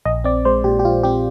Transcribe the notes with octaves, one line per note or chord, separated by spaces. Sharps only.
A#1 D#5
C4 D5
G#3 C5
A#2 G4
G4
A#1 F4
C4 G4